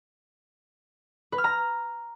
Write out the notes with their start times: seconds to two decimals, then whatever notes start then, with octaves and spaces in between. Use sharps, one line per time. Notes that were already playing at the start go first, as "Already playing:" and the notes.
1.32 B4
1.38 F6
1.44 A#5